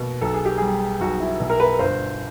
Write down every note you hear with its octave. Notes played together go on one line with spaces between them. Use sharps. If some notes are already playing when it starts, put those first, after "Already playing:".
Already playing: B2 A#3
B1 A4
G#4
G4
G3 G#4
B1 F#4
E4
B2
A#4
B4
G1 C5